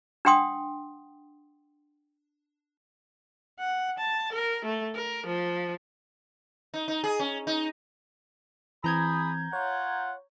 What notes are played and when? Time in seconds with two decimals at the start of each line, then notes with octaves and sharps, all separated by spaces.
0.25 D4 F#5 G5 C6 D#6
3.60 F#5
3.98 A5
4.33 A#4
4.65 A3
4.96 A#4
5.27 F3
6.74 D#4
6.88 D#4
7.04 G#4
7.19 C#4
7.47 D#4
8.84 E3 C4 G#4 A#5 B5 D#6 G6 G#6
9.53 F4 C#5 F#5